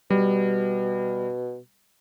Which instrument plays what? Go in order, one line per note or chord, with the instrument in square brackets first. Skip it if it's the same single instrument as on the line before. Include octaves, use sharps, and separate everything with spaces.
[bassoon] B2 [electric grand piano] G3